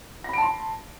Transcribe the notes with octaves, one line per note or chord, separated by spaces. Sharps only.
A5 B5 C6 A#6 D7